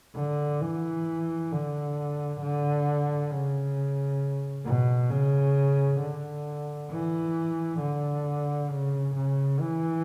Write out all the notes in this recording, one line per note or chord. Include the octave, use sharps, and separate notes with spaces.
D3
E3
D3
D3
C#3
B2
C#3
D3
E3
D3
C#3
C#3
E3